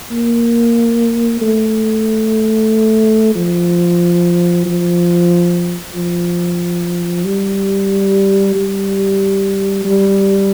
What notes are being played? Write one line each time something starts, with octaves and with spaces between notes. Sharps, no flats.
A#3
A3
F3
F3
F3
G3
G3
G3